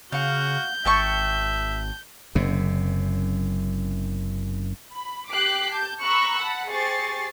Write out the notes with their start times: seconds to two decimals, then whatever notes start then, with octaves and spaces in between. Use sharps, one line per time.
0.12 C#3 F#4 F5 F#5 G6
0.85 G#1 E5 G5 A5 C#6
2.35 F#1 F#2 C3
4.94 B5
5.31 G4 G5 D6 F#6 B6 C7
5.72 A5 G6
6.03 A#5 B5 C#6 E6 F#6
6.41 F#5 A5 B5
6.71 G4 G#4 C5 C#6 A6 C7